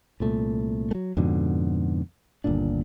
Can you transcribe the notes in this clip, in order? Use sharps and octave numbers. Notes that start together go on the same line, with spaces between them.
C2 A#2 A3
F#3 A3
F2 G#2 B2 D3
G1 D#2 A#2 D4